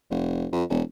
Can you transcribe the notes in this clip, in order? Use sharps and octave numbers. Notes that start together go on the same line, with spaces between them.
F1
F2
E1